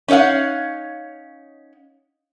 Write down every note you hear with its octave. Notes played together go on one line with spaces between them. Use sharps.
C#4 D#4 C#5 F5 F#5